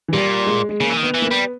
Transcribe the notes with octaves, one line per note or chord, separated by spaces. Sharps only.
E3
A#2 G3
G#3
G#3
C#3 A#3
E3
D#3
B3
E3
A#3
B3
G3